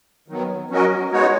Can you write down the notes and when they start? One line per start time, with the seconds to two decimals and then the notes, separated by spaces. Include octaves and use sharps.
0.28 D#3 F#3 B3
0.70 F#3 C#4 F#4 A#4 D#5
1.12 G#3 B3 D#4 F#4 C#5